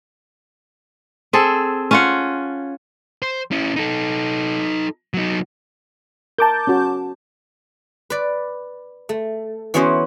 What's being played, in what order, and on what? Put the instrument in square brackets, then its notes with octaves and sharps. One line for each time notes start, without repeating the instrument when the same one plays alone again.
[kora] C4 G#4 A4
C#4 F4 F#5
[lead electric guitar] C5
C#4 E4
D#4 A4
F#3 D#4
[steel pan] A#4 [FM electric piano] A5 D6 G6
[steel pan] C#4 F#4
[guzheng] B4 D5
A3
E3 B3 C#4 F#4 C5 D#5